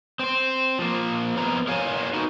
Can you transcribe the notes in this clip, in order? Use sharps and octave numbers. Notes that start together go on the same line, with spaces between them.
C4 C5
F3 A#3
F3 B3 A#5
A#4 C#5 F5 G#5
D#4 F#4